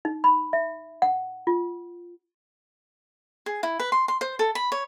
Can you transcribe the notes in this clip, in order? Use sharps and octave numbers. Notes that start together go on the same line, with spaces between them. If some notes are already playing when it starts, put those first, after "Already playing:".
D#4
B5
E5
F#5
F4
G#4
E4
B4
C6
C6
C5
A4
B5
C#5